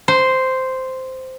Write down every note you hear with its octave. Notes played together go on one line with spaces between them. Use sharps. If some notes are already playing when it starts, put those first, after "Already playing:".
C5